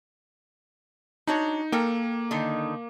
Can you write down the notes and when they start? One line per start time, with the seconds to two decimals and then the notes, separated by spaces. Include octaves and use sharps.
1.27 D4 D#4 F#4 C#5
1.72 A#3 A4 A#4 G5
2.31 D3 D#3 D#4